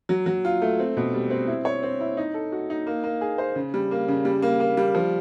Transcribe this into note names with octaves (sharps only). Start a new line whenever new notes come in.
F#3
F#3
F4
A3
C4
B2
G3
C4
E4
C#5
C4
E4
D#4
A4
F#4
D#4
A#3
A#3
G#4
C5
C#3
G3
A#3
C#3
G3
A#3
A#3
G3
F3